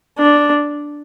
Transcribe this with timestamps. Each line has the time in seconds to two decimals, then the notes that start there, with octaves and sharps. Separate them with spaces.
0.19 D4